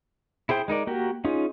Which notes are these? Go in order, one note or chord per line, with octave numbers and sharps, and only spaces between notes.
E4 G#4 C5 G5
G#3 D#4 A#4 D5
A#3 F#4 G4 A#4
C#4 D#4 F4 G#4